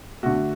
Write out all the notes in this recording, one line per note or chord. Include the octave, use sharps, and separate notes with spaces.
D3 A3 F#4